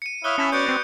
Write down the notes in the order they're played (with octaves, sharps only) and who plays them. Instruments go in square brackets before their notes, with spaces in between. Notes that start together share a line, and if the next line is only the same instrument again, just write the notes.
[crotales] C#7 D#7
[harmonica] E4 C#5 F5 [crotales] D#6 F#6 G7
[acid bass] C#4 [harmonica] E4 A5 B5
[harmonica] B3 F#4 D5 [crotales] G6 C#7 D7
[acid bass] C4